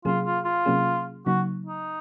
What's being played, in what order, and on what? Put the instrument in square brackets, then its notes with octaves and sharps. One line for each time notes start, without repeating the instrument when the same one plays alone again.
[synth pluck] C3 F#3 A#3 C#4 G#4 [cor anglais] F4
[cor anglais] F4
F4
[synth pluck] C3 F#3 A#3 C#4 G#4
[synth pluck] C#3 F#3 A#3 D#4 [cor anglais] F#4
[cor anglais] D#4